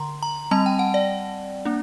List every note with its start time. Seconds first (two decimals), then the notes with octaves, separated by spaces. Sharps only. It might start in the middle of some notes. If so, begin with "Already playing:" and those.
Already playing: D3 A#5 C6
0.23 A#5
0.51 G3 C4 A5
0.66 G5
0.79 F#5
0.94 D5
1.65 A#3 D4